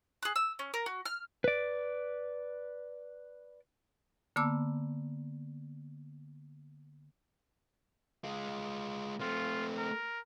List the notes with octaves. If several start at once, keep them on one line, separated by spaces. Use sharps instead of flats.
G#4 F#6
E6
C#4
A#4
F#4
F6
B4 D5
D3 A#3 B3 A5 D6 E6
G#3 F4
A3 C4 F4
A#4